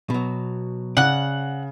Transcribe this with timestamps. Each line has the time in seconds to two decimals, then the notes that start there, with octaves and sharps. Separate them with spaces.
0.10 B2 F#3
0.97 C#3 D5 F#5 F#6